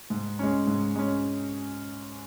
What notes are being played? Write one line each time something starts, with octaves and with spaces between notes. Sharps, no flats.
G#2
G#3 C#4
G#2
G#3 C#4